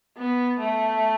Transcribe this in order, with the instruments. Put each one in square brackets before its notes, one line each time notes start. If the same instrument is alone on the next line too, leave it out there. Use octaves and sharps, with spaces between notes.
[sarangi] B3
A3